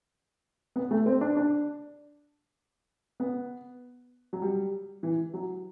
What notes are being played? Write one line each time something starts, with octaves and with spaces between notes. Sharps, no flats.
B3
A3
C4
D4
D4
B3
F#3
G3
E3
F#3